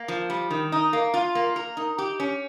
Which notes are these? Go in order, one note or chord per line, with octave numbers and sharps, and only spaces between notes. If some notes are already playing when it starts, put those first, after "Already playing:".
Already playing: A#3
F3
G3
D#3
D#4
A#3
F4
A#3
A#4
D#4
G4
C#4